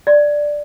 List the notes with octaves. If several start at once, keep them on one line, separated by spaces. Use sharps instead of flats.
D5